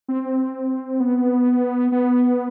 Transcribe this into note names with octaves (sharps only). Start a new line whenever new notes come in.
C4
B3
B3